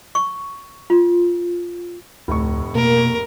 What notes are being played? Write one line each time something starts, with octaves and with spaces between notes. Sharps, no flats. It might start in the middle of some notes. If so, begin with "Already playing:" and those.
C#6
F4
F1 D2 A2 C#6
B2 A#3 A#4